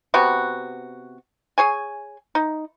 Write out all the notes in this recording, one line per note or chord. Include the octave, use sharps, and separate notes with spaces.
C3 B3 F#4
G#4 C#5 G#5
D#4